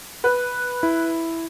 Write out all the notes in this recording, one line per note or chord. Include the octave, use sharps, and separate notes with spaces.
B4
E4